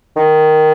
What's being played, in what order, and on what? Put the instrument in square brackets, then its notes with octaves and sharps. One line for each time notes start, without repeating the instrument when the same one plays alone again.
[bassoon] D#3